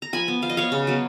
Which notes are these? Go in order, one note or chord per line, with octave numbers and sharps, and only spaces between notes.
A#5
F3 G#5 B5
B3
F3 F5
D#5
B3 C#5 F5
C#3
F#3 B3